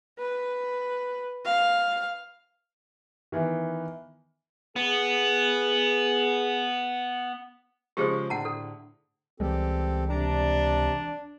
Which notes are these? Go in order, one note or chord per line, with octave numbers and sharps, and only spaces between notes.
B4
F5
D#3 E3 B3 E4
B3 G#4
C#3 F3 G#3 G4 G#4 C5
A2 D3 F#5 A5 A#5
A4
C#2 E3 G3 G#3 C4 G4 A4
C3 D4 A#5